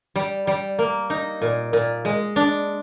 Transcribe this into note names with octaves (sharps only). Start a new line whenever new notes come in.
G3
G3
A#3
D#4
A#2
A#2
G#3
D4